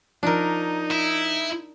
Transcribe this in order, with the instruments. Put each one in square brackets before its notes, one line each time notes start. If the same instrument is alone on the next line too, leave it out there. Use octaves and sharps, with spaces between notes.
[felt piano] F3 [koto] D4 A#4 [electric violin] D#4
[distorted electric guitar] E4